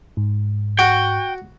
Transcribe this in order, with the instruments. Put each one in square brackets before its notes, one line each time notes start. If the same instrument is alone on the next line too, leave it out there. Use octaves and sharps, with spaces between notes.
[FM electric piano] G#2
[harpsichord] F#4 [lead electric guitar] G5